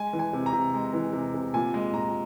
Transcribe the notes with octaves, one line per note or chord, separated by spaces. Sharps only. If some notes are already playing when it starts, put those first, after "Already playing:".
Already playing: G#3 G#5
E3
G#5
C3
A#5
C3
G#3
E3
C3
C3
A#2 G#5
G#3
A#2 A#5